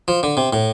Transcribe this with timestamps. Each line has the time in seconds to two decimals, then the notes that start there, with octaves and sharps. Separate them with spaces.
0.08 F3
0.23 D3
0.37 C3
0.53 A2